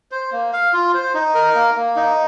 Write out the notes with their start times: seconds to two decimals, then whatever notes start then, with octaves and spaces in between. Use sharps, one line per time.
0.11 C5
0.32 A#3
0.53 F5
0.73 F4
0.94 C5
1.14 D#4
1.34 A#4
1.55 A#3
1.76 A#3
1.96 D#4